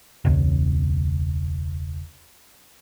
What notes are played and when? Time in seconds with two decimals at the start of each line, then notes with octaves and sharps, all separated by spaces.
0.25 E1 C#2